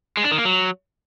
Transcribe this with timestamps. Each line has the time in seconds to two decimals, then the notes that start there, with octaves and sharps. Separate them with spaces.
0.17 G#3
0.24 D4
0.31 D#3
0.38 A#3
0.45 F#3